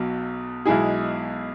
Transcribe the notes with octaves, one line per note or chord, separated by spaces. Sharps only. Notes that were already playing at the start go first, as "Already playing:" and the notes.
Already playing: B1 B2 F#3
B1 B2 G#3 E4 G#4